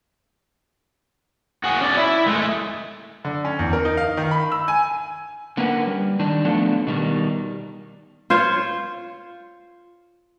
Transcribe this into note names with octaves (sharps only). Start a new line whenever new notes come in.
F#4 G#4
C#4 D5
E4 E5
G#3 A3
D3
C#4
E2
A#4
D#4
F5
D#3
B5
E6
G#5
D3 A#3 C#4 A#4 B4 F#5
G3
D#3 D4 D#4
F3 F#3 A3 B3 D4 A4
B2 D#3 G3
F4 C5 C#5